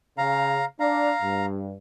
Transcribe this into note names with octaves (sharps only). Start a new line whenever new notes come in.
C#3 F5 A#5
D4 F5 A#5
G2